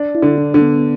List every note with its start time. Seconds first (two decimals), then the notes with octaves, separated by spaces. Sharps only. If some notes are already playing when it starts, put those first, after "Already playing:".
Already playing: D4
0.15 E4
0.22 D3
0.38 D4
0.54 D3
0.62 B3